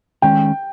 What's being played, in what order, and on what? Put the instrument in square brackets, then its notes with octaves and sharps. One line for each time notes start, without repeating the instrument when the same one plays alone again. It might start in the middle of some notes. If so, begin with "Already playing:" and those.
[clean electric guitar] D#3 G#3 C#4 [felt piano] G5